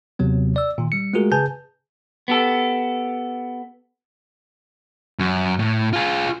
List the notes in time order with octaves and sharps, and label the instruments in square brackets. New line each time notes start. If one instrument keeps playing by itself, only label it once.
[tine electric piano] D#2 C3 F#3 B3
D5 E6
A#2 D#3
G3 C#7
G#3 A3 F4 F#4 G#4 A#4
C#3 G#4 B4 G#5 A5 G6
[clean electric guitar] B3 G4 A4
[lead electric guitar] F#2
A2
F4 G#4